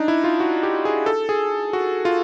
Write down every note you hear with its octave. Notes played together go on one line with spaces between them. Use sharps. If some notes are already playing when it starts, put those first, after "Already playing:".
Already playing: D4 D#4
E4
F4
F#4
G4
G#4
A4
G#4
F#4
F4